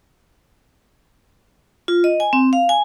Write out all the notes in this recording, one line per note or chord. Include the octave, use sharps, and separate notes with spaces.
F4
D#5
G#5
C4
F5
G#5